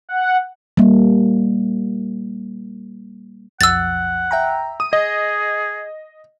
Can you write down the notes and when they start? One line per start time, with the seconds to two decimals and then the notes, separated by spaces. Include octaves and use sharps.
0.09 F#5
0.77 G3 A#3
3.61 B1 F2 F#5 E6 A6
4.31 E5 G5 A#5
4.80 D#6 D#7
4.93 G#4 D#5